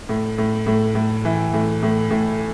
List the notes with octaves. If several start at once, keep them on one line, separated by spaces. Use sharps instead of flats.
A2
A2
A2
A2
E3
A2
A2
A2